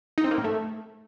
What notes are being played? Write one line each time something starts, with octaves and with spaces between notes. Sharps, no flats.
D#4
C4
A#3
A2
A3